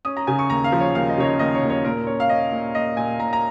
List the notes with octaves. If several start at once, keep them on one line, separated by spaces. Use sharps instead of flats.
C#4 D#6
A#5
C#3 G#5
C#6
D#2 A#5
F5
F3
C#5
D#2 F5
D#5
C#3 C#5
D#5
D#2 D#5
C#5
D#2
C#5
A#2 A#4
C#4 C#5
F5
C#4 D#5
A#2
A#2 D#5
A#2 G#5
A#2 A#5
A#5